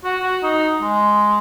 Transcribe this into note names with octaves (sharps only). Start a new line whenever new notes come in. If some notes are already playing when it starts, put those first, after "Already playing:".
F#4
F#4
D#4
G#3